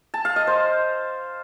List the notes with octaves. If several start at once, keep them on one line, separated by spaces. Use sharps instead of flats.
A5
F5
D#5
C5